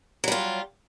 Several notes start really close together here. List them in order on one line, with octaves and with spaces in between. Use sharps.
F#3 G3 F4